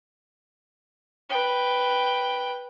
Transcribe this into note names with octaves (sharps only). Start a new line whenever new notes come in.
B4 G5